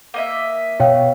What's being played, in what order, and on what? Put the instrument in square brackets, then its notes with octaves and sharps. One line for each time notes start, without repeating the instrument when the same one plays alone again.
[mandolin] A#3 D#5 E5
[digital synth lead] B2 [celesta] C#5 F5 G5